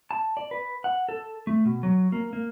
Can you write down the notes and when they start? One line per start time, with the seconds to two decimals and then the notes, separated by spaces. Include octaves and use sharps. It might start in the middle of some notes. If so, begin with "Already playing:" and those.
0.11 A5
0.37 D5
0.51 B4
0.84 F#5
1.09 A4
1.47 A3
1.65 B2
1.83 F#3
2.12 A#3
2.33 A#3